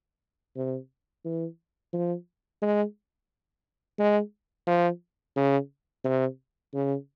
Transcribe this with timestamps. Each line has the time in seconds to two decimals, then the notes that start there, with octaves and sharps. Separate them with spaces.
0.56 C3
1.25 E3
1.93 F3
2.62 G#3
3.99 G#3
4.67 F3
5.36 C#3
6.04 C3
6.74 C#3